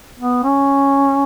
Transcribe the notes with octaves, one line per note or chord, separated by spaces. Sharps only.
B3
C#4